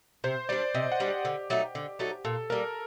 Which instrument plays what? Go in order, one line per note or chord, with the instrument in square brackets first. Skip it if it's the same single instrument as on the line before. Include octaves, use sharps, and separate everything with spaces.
[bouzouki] C3 [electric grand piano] C5
[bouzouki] G3 D4 [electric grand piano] D5
[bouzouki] C3 [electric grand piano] D#5
[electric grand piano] F#5
[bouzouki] G3 D4
[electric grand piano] G4
[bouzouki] D3
F#3 A3 D#4
D3
F#3 A3 D#4
[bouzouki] A#2 [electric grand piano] A4
[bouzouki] G3 A#3 [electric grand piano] A#4